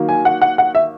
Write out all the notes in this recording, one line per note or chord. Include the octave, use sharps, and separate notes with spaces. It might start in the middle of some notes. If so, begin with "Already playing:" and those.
Already playing: D#3 F#3 A#3
G#5
F#5
F#5
F#5
E5